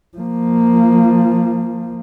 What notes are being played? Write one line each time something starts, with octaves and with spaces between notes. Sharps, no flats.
F3 A#3